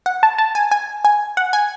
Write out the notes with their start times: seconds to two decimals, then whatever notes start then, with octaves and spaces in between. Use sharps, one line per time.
0.06 F#5
0.23 A5
0.38 A5
0.55 G#5
0.71 G#5
1.05 G#5
1.37 F#5
1.53 G#5